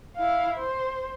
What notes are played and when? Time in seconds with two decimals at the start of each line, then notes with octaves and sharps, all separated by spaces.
0.16 E4 F5
0.57 C5